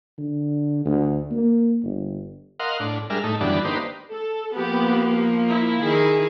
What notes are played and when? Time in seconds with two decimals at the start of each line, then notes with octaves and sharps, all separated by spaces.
0.18 D3
0.86 D2
1.31 A#3
1.84 G1
2.60 A#4 D#5 F5 F#5 C6
2.80 A2 D4
3.10 G3 G#3 D4 A#4 E5 F6
3.24 A2 A3 D#4
3.41 F#2 D3 E3 G3 B3 D4
3.65 A#3 D4 D#4 G4 B4 C5
4.13 A4
4.55 F3 A#3 B3 G4
5.49 E4
5.82 D#3 G#4